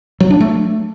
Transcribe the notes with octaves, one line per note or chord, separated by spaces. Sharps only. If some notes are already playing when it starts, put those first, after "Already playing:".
F#3
D4
A3